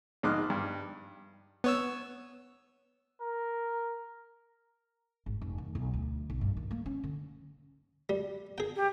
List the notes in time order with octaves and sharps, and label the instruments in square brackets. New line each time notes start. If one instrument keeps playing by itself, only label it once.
[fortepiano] A#1 G#2 D#5 D6 F6 F#6
G2
[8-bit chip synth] B3 C#5 E6
[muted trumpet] A#4
[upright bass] G#1
F1
D#3
B1
D2
B1
G2
D#3
A#3
C#4
D3
[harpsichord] G3
G#4 G5
[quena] G4